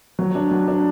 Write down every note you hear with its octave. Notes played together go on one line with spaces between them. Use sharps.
F#3
D4
F#3
D4